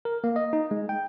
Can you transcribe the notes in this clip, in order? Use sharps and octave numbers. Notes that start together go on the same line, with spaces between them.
A#4
A#3
D#5
D#4
G#3
G5